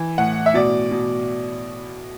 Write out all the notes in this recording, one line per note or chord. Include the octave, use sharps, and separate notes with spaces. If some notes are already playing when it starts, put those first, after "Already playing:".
Already playing: E3
A2 F#5
E5
B2 D5
B2